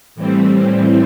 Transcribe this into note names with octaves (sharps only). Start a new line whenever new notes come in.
A2 E3 G3 C4